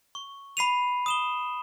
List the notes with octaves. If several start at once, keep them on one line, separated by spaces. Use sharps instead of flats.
C#6
B5 C7 D#7 F7
D#6 E7 G7